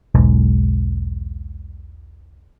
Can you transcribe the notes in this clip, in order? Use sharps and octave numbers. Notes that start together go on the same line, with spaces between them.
E1 B1 G#2